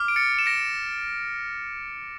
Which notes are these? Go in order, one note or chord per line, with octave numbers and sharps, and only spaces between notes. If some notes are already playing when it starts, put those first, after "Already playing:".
Already playing: D6 F6
D7
A6 C#7
E7
A#6 D7